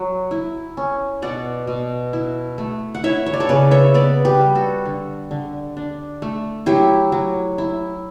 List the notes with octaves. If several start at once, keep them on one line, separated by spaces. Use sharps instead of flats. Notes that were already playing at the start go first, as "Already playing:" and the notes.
Already playing: F#3
E4
C#4
B2 D5 F#5
B2
E4
A3
F#5
E4 C#5 E5
C#5
D5
A4 C#5
C#3 B4 D5
C#5 E5
B3 B4 D5
G4 B4
G3
F#4 A4
D3
D3
D4
A3
F#3 E4 G4
F#3
E4